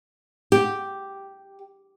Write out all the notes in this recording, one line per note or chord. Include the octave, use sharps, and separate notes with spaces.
G4